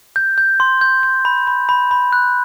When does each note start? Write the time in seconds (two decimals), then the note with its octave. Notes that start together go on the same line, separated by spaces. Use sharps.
0.16 G6
0.38 G6
0.60 C6
0.81 G6
1.03 G6
1.25 B5
1.47 B5
1.69 B5
1.91 B5
2.13 F#6